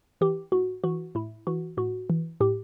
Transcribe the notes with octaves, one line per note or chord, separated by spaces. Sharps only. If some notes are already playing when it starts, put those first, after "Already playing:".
E3 G4
A2 F#4
E3 F#4
A2 E4
E3 F#4
A2 F#4
E3
A2 G4